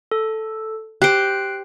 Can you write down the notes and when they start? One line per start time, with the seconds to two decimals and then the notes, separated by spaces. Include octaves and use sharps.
0.12 A4
1.02 G4 C5 F#6 C7 D7